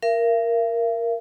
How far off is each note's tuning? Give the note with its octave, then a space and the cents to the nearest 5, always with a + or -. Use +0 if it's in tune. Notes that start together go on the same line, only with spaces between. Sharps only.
A#4 +0 E5 +45